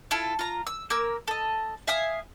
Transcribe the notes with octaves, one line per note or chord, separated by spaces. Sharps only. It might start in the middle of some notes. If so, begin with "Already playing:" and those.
E4 F4 A4
F4 A#5
E6
A#3 A#4 E6
A4 D#5
E5 F5 G#5 D#6